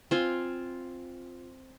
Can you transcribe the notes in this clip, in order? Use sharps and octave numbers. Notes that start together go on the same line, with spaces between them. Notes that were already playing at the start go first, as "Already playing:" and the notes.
C4 F4 G#5 C6